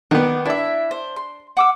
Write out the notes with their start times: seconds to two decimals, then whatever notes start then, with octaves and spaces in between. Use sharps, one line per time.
0.11 D#3 B3 D5 F#5
0.45 D4 E4 E5
0.91 C5
1.16 C6
1.57 F#5 D6 E6